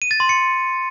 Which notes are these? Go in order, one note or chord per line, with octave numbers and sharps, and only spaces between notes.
D#7
A6
C6
C#7